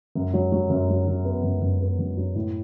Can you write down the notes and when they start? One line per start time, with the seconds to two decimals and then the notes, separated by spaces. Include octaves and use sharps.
0.15 F#2
0.34 F#3
0.52 F#3
0.70 F#2
0.89 F#3
1.07 F#3
1.25 B3
1.43 F#2
1.62 F#2
1.81 B3
1.99 F#2
2.17 F#3
2.35 A2